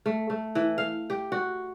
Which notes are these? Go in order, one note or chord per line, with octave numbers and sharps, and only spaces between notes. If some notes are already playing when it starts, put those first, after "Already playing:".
A3
A3
E3
F5
G4
F#4